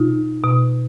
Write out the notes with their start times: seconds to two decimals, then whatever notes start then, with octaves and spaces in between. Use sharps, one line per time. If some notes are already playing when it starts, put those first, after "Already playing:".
Already playing: B2 D#4 F4
0.44 B2